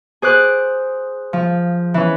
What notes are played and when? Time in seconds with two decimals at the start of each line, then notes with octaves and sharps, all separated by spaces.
0.22 G#4 C5 D6 F#6
1.33 F3
1.94 E3 C#4